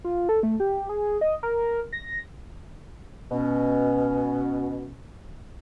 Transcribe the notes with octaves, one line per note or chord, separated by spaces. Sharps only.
F4
A4
A3
G4
G#4
D#5
A#4
A#6
B2 C#4